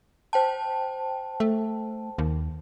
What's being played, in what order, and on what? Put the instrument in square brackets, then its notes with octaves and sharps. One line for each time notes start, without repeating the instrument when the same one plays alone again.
[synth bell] C5 G5 A5
[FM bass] A3
D#2